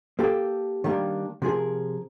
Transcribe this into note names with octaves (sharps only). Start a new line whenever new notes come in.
A#3 G4 A4
D#3 G3 A#3 D4
C3 F3 G#4 A#4